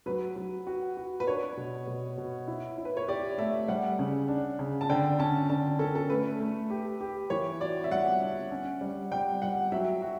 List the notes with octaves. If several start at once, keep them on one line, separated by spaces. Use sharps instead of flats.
F#3 B4
F#3
F#4
F#4
B4
D4 C#5
B2
B2
B2
E4
E4
B4
C#5
G4 D5
A3 E5
G3 F#5
C#3
D4
C#3
A5
D3 G5
C#4 A5
D3 A5
C#4 A4
A4
A3 B4
A3
G4
G4
E3 C#5
F#4 D5
E5
G3 F#5
D4
C#4
G3
G3 G5
G3 F#5
F#3 E5
F#4